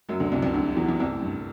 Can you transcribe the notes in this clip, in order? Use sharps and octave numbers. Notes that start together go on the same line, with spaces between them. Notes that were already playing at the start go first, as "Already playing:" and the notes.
F#2 F#3
D2 D3
C2 C3
C2 C3
D2 D3
E2 E3
E2 E3
C2 C3
A2
G2